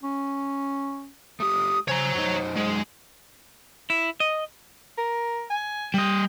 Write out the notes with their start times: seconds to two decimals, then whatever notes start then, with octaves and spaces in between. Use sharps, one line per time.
0.03 C#4
1.40 A3 G4 D#6
1.88 C#3 C5 C#5 G#5 A#5
2.15 F#2 D#4
2.56 G#3
3.90 E4
4.20 D#5
4.98 A#4
5.50 G#5
5.94 G3 D#5 G5